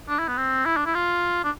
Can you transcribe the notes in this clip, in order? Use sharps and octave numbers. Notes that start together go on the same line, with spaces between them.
D4
E4
B3
C4
E4
D4
E4
F4
D4